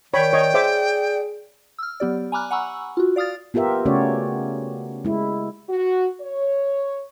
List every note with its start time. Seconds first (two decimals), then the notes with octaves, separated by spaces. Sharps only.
0.14 D#3 C#5 D5 G5 B5
0.33 C#5 D#5
0.54 G#4 C5 E5 D6
1.78 E6 F6
2.00 F#3 B3 G4 D5
2.32 G#5 A#5 B5 D6 F6 F#6
2.51 F#5 G#5 A#5 B5 C#6 E6
2.97 F4 F#4
3.16 D5 F5 D#6 F6 A6
3.54 B3 F4 G4 A#4 E5
3.85 C#3 A3 C#4 F#4 C#5 D5
5.05 G#3 E4
5.68 F#4
6.20 C#5